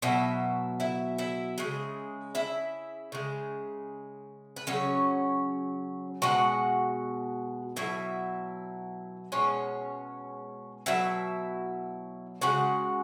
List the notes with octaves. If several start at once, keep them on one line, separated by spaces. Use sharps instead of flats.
B2 F#3 E4 E5
E4 E5
E4 E5
C#3 G#3
E4 E5
C#3 G#3
B4
C#3 F#3 C#4 C#5
B2 G#3 F#4 F#5
B2 F#3 E4 E5
B2 G#3 C#4 C#5
B2 F#3 E4 E5
C#3 G#3 F#4 F#5